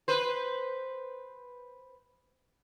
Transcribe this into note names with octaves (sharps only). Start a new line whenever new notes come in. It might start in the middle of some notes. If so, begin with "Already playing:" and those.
B4 C5